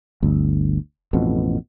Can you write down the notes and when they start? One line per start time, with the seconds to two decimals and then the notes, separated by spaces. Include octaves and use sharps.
0.22 G1 D2
1.13 A1 F2 B2